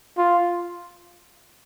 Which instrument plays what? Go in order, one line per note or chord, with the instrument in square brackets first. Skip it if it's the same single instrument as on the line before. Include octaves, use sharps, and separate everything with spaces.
[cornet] F4